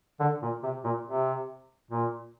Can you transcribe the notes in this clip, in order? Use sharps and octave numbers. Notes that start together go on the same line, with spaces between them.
D3
A#2
C3
A#2
C3
A#2